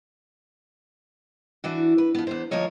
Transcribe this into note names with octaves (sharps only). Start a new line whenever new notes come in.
E3 D4 F#4
B4
F3 B3
E2 B3 C5
D2 F3 A#3 A#4 C#5 D#5